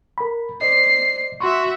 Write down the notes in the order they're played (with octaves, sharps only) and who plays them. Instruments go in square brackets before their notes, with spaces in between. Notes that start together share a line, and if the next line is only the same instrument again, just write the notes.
[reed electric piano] A#4 B5
[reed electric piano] C5 D5 D#5 [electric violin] C7
[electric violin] F#4 E5 [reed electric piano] C6 C#6